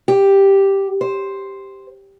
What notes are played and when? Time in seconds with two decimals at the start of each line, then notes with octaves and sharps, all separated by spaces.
0.08 G4
1.01 C5